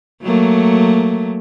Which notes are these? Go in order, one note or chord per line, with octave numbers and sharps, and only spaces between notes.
F#3 A3 A#3